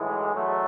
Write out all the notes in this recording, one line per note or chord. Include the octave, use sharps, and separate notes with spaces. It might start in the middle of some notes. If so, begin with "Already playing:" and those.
Already playing: B1 A2 E3 G#3
E2 B2 F#3 A3